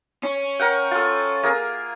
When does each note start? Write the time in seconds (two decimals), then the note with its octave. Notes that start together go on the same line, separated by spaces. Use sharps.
0.23 C#4
0.60 A#4 F#5 G5
0.91 F4 A4
1.43 A#3 G#4 A#4